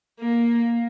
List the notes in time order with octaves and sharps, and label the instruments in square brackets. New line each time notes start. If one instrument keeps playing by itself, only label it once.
[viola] A#3